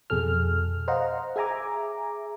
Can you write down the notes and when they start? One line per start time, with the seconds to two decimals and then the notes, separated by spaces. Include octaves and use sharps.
0.10 F2 B2 G#4 A4 F6
0.88 C5 D#5 F5 F#5 A#5
1.36 G#4 E5 G#5 A#5 D6